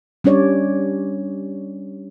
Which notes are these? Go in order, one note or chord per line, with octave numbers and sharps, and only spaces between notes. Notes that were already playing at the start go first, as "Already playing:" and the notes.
G3 C#4 D4 C#5 D5